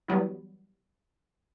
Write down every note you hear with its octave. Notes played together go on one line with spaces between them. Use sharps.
E3 F#3 G3 B3